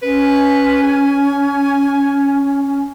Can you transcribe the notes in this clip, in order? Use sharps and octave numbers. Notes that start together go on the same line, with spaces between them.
C#4 B4
G#5